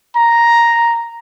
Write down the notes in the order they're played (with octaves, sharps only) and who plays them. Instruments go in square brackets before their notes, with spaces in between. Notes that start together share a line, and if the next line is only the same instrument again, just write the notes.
[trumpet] A#5